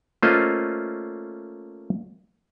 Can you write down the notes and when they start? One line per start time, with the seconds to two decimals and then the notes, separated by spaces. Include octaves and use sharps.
0.23 A3 A#3 C#4 F4 C5 D#5